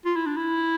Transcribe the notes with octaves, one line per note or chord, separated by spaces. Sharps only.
F4
E4
D4
E4